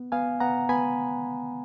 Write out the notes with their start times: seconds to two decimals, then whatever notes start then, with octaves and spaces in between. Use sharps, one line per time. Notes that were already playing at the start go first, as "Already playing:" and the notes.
Already playing: B3
0.12 B3 F5 G#5
0.40 B3 F#5 A#5
0.69 B3 G#5 B5